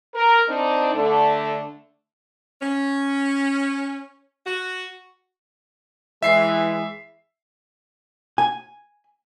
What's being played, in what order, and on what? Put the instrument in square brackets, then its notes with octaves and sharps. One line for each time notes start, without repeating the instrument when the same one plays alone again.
[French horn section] A#4
C4 D4 D#4
D3 A3 D4
[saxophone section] C#4
F#4
[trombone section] E3 G#3 [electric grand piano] E5 C7
[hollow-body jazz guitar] G#5